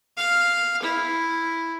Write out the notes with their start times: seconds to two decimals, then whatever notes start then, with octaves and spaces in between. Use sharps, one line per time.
0.17 F5
0.83 E4